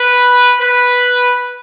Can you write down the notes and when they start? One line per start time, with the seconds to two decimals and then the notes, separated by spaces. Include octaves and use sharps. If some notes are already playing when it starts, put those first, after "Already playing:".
Already playing: B4
0.60 B4